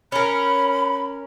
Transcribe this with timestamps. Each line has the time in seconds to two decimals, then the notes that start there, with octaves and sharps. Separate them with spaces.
0.12 C#4 A#4 B5